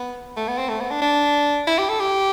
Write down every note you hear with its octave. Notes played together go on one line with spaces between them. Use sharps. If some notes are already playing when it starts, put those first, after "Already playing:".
Already playing: B3
A3
B3
C4
A3
B3
D4
D4
E4
G4
A4
G4